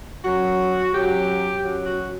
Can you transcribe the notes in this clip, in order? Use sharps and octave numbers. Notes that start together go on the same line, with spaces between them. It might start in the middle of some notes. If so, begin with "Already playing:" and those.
F#2 F#3 F#4
F#2 F#3 G4
F#2 F#3
F#4